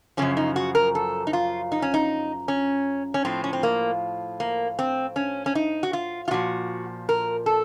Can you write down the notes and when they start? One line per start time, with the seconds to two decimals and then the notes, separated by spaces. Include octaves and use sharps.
0.17 F#2 C#3 F3 C#4
0.37 D#4
0.56 F#4
0.75 A#4
0.95 A4
1.27 D#4
1.33 F4
1.72 D#4
1.82 C#4
1.94 D#4
2.48 C#4
3.14 C#4
3.25 A2 F3 C4
3.44 C#4
3.53 C4
3.63 A#3
4.40 A#3
4.79 C4
5.16 C#4
5.46 C#4
5.55 D#4
5.83 F#4
5.93 F4
6.28 F4
6.31 A#2 F3 F#4
7.09 A#4
7.46 A4